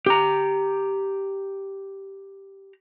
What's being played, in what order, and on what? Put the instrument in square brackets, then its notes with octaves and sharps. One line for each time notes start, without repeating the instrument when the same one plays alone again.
[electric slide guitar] G4 A#5